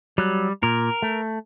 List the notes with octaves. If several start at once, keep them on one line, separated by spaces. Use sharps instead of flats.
F#3 G3
A#2 A#4
A3